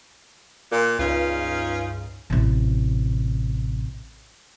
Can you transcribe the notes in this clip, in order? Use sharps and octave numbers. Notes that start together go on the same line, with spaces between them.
A#2
C#2 G2 C#4 D#4 F4
A1 C3